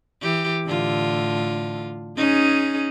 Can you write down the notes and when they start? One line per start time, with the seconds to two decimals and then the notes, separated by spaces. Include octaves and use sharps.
0.22 E3 G4
0.66 A2 D3 F4
2.17 C#4 D#4 G#4